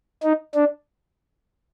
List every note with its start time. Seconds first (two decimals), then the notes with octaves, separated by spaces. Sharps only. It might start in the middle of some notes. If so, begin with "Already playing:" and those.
0.23 D#4
0.54 D4